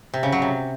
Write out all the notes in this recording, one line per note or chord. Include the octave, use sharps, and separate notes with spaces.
C3
C#3
F#3
C3